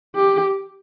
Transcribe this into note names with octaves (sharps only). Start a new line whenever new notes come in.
G4